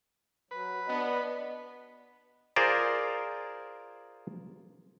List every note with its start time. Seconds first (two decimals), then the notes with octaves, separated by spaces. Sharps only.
0.51 F#3 B4
0.88 B3 D4 D#5
2.56 F4 G#4 A#4 C5 D5